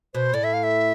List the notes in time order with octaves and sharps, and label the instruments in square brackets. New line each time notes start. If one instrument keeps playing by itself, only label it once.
[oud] B2 [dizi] C5
[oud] A2 [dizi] D5
[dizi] E5
F5
E5